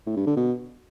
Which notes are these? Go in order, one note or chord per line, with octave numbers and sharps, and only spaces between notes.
A2
G2
D3
B2